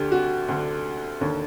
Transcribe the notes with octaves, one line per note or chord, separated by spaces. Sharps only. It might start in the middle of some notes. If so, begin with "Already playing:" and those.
Already playing: D2 D3 G4
F#4
D2 D3
D#2 D3